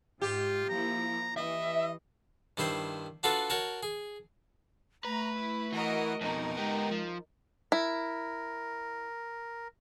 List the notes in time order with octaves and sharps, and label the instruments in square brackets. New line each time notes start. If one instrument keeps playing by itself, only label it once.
[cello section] G#2 [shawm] F4 [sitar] G4
[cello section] F3 A#3 E4 [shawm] A#5
[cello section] E3 [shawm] D#5 [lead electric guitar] E5
[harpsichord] G2 D#3 E4 C5 C6
D4 F4 F#4 A4 B4 F5
F#4 A#4 C#5 A5
G#4
[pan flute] A3 [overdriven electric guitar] B4 [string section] A#5
[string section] E4
[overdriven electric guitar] E3 [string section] F#4 A#4 D#5
[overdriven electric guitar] F2 B2 [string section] D#4 A#4
[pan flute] G#3 [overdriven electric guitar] B3 G4
[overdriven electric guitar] F3
[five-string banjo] E4 [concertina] A#4